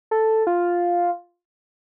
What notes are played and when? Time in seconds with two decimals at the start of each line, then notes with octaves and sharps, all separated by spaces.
0.11 A4
0.47 F4